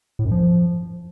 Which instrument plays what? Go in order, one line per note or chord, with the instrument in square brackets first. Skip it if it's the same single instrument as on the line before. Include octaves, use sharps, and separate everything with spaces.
[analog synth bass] A2
F#2
F3